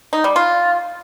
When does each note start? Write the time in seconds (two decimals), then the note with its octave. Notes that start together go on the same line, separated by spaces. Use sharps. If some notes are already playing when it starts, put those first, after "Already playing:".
0.13 D#4
0.24 G3
0.36 F4